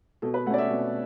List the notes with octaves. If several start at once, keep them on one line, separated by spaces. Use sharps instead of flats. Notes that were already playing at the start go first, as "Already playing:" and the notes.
B2 A4
B4
A3 C#4 D5 F#5
E5
B2